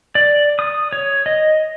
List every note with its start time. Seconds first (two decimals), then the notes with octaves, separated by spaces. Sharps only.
0.15 D5
0.59 D#6
0.93 C#5
1.26 D#5